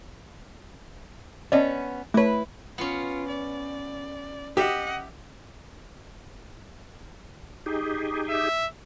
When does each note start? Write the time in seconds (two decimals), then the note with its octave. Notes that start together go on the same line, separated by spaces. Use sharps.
1.52 B3 C#4 D5 D#5
2.14 A3 E4 B4 C#5
2.78 B3 C#4 F4
3.28 D5
4.57 G4 D#5 E5 F#5
7.66 D#4 G4 G#4
8.29 E5